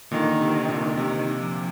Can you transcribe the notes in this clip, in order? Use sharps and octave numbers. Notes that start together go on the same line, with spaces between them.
A#2 D3 D#3
C3
A#2
C3 D#3
F3